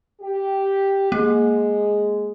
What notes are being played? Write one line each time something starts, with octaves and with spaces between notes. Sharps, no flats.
G4
G#3 A#3